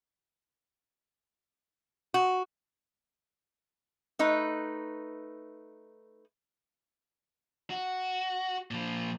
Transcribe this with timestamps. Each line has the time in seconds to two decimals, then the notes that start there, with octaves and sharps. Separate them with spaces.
2.14 F#4
4.19 A3 D#4 B4
7.70 F#4
8.71 A#2 F3